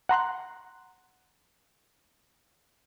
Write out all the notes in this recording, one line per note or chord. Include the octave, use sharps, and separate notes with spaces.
F#5 A#5 C6 F#6